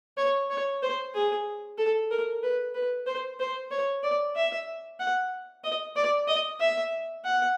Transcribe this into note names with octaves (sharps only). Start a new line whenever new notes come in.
C#5
C#5
C5
G#4
A4
A#4
B4
B4
C5
C5
C#5
D5
E5
F#5
D#5
D5
D#5
E5
F#5